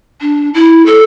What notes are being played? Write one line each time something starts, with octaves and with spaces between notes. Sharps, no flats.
D4
E4
A4